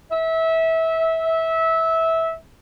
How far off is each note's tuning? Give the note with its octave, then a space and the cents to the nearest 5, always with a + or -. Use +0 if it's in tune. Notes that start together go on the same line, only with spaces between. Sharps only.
E5 -20